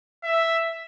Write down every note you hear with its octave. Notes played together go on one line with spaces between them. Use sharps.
E5